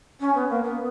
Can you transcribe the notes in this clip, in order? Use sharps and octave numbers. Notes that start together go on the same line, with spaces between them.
C#4
B3
A#3
B3